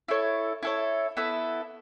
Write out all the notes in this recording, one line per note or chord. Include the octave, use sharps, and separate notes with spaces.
E4 A4 C#5
E4 A4 C#5
B3 E4 A4 E5